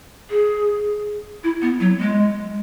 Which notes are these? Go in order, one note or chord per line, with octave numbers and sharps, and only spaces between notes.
G#4
E4
B3
F#3
G#3